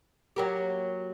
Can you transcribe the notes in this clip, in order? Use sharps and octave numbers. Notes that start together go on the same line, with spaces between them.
F#3 A#3 G4